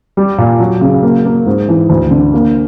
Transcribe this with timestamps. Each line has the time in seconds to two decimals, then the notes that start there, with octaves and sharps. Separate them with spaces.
0.17 G3
0.38 A#2
0.60 F#3
0.81 C#3
1.03 A#3
1.25 A#3
1.46 G#2
1.69 E3
1.89 D2
2.11 D3
2.34 A#3